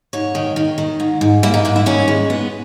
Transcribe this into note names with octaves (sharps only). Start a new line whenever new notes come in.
G#2 C#5
D#3
D#3
D#3
G#2
G#2
A#3 E4
D#4
G#2 E4
E4
D#3 C#4
G#3
B3